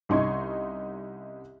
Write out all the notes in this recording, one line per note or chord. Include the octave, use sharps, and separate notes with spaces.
C2 C#4 D#4 C6 C#6 G#6